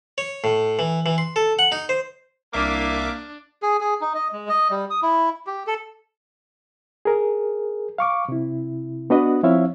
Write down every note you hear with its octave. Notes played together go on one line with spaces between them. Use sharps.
C#5
A2
E3
E3
C6
A4
F#5
D#4
C5
C2 A#3 D4 E5 D6
G#4
G#4
D#4
D#5
G#3
D#5
G3
D#6
E4
G4
A4
G#4 A#4
F5 C#6 D6
C3 E4
B3 D4 F#4 B4 D#5
F3 C4 E4 C#5 E5 F5